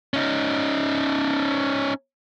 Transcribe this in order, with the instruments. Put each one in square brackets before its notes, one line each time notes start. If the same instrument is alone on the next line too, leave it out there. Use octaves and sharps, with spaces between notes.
[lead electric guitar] C#4 D#4